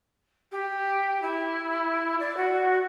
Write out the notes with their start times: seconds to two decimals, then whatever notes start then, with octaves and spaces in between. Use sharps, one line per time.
0.51 G4
1.22 E4
2.19 D5
2.36 F#4